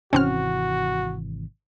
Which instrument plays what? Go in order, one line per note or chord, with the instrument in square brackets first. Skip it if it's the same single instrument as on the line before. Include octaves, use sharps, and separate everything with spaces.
[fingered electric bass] G#1 C3 E3 [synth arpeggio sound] C4 C#4 F6 [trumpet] F#4